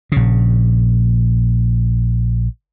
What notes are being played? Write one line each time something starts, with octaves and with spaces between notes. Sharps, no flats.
A#1 C#3